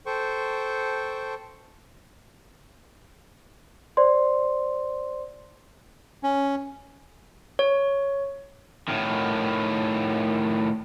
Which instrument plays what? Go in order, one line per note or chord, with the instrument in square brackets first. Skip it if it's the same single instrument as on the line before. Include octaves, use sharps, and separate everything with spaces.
[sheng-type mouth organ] A4 C5 G5 C#6
[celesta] C5 D5 C6
[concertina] C#4
[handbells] C#5
[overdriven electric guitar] A2 D#3